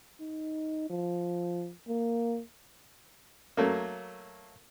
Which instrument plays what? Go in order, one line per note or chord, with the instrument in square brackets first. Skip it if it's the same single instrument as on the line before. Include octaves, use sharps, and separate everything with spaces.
[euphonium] D#4
F3
A#3
[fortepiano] F#3 A3 A#3